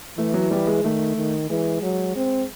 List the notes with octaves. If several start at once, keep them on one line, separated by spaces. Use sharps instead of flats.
E3 A3
F#3
G3
G#3
D#3 A3
D#3
E3 G#3
F#3
C4